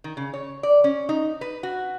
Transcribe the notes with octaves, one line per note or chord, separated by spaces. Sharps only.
D#3
C#3
C#5
D5
C#4
D#4
B4
F#4